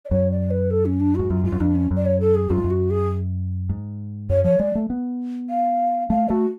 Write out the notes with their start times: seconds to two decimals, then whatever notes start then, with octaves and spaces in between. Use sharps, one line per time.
0.05 D5
0.10 F#2 C#5
0.31 D5
0.51 B4
0.71 A4
0.85 C#4
1.00 D4
1.15 G#2 F#4
1.30 F#2 F4
1.44 G#2 F4
1.52 F#2
1.60 F2 D4
1.75 C#4
1.91 F#2
1.96 D5
2.05 C#5
2.20 A4
2.35 G#4
2.50 F#2 F4
2.57 G#2
2.64 F#2
2.70 F#4
2.90 G#4
3.69 G#2
4.29 F#2 C#5
4.44 F3 C#5
4.59 G#3 D5
4.75 A3
4.90 B3
5.50 F5
6.10 A3 F5
6.29 A3 F#4